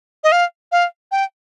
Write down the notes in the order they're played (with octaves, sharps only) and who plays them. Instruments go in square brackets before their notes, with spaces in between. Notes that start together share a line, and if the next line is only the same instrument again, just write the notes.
[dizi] D#5
F5
F5
G5